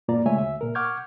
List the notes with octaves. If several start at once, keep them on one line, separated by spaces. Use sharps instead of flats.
G2 A#2 A#3 F4 D5 A#5
C#3 G#3 A3 C#5 E5 G#5
D2 E5
A#2 A#4
F#5 C#6 D6 F6 G6 G#6